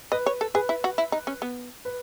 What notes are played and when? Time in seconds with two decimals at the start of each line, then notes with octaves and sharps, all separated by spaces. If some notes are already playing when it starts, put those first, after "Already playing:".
0.12 B4 D#5
0.26 C#5
0.41 A4
0.54 G#4 B4
0.69 E4
0.84 F#4
0.98 E4
1.12 D#4
1.27 C#4
1.42 B3
1.85 B4